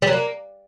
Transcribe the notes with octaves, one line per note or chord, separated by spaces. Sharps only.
G3
F#3
A#3